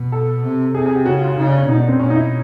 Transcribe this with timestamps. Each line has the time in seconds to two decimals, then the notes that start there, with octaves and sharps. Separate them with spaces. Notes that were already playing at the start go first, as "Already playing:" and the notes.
Already playing: B2
0.12 A4
0.43 C3
0.75 C3 G#4
0.86 G#4
0.95 G4
1.05 C#3 F#4
1.22 F4
1.37 C#3 D#4
1.47 D4
1.58 C#4
1.68 B2 D#4
1.78 D4
1.88 C4
1.99 B2 C#4
2.10 D#4
2.16 E4